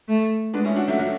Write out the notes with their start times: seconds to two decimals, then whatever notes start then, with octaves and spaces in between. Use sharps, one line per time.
0.08 A3
0.54 G#3 B3 D4
0.65 C#4 E4
0.76 D4 F#4
0.88 F#3 A3
0.99 F#3 A3